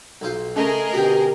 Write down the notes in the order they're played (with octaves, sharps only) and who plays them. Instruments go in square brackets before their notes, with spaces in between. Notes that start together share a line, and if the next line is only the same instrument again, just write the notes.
[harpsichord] B1 F4 C5
[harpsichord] C#3 A3 [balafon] C#4 [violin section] G#4 A#4 D#5
[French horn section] B2 D3 G4 [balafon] F#4 [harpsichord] B4 G5